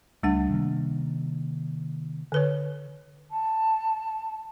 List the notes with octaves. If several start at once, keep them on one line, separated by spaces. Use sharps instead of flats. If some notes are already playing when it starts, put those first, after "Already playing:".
C#2 G3 A3 D4 F#5
C3 D#3 A#3
D3 B4 C#5
A5